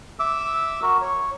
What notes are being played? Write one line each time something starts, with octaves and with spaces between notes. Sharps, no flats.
E5 D6 E6
F#4 A#4
C#5